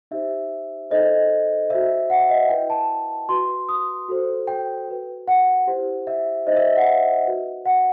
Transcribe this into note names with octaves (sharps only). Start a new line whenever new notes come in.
D#4 G4 C5 E5
D#4 A4 C5 D#5
F#4 C5 E5
F#5
E5
D#5
E5
E4 B4 G5
A5
F#4 B4 C6
D#6
F#4 A4 C5
G5
F#4 B4
F#5
E4 G4 C5
E5
D#4 G4 C5 D#5
E5
E5
F#5
E5
F#4 B4
F#5